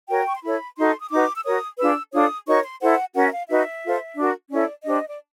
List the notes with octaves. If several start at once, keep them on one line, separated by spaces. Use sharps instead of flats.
F#4 A#4 C#5 G5
C#6
C6
E4 A4 C#5 B5
D#4 F#4 A4 C6
D#6
D#4 F#4 B4 D6
E6
F#4 A#4 C#5 D#6
D4 F4 G#4 B4 E6
D4 F4 A4 C#5 D#6
D#4 F#4 A#4 C#5 C#6
C6
E4 A4 C5 F#5
C#4 F#4 A#4 F#5
E5
F5
D#4 F#4 B4 E5
F4 A4 C5
D4 F#4 A#4
C#4 E4 A4 C#5 D5
D4 G4 C5 D#5
D5